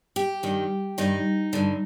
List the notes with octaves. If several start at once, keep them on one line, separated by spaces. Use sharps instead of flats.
G4
G2 D#3
G2 D#3 D#4
G2 D3